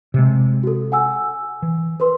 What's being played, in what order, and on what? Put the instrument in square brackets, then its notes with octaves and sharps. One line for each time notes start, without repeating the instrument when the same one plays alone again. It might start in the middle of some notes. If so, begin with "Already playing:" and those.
[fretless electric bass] C3 G#3
[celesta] F#4 A4
F#5 G#5 E6
[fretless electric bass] E3
[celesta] A#4 B4 C6